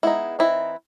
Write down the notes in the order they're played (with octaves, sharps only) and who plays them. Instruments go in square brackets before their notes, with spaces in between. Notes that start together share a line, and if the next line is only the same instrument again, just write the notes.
[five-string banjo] G#3 B3 D#4 E4
E3 G3 C4 D#4 E4